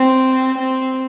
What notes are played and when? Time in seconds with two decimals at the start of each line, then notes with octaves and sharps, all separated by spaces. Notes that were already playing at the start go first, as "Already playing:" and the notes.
Already playing: C4
0.59 C4